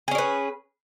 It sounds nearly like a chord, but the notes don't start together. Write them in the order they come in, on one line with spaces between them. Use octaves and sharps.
G#4 C#4 D5 B4